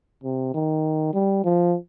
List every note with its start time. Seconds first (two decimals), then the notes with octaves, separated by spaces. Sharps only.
0.24 C3
0.54 D#3
1.14 G3
1.44 F3